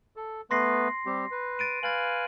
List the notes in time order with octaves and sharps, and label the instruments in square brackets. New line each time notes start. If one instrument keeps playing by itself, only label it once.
[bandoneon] A4
[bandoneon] A3 B3 B4 [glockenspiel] C6 A#6 C7
[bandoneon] G3 C4 G4
B4
[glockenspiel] A6 D7 D#7
[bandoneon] B4 F5 G#5 [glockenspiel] A6 F#7